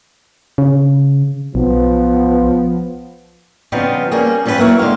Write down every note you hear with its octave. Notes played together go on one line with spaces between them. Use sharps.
C#3
B1 F3 B3
C#3 F3 G3 B3 C4 D#4
G3 A#3 C#4 G#4
G2 F3 C#4 D#4 B4 G5
F#3 A#3 E4 C#5
D3 G#3 C5 F5